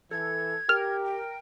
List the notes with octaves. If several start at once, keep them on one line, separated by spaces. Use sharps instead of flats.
E3 A4 G#6
G4 A#4 F6
G5